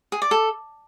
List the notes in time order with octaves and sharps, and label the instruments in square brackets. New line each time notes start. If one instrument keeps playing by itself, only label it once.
[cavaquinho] G#4
D5
A4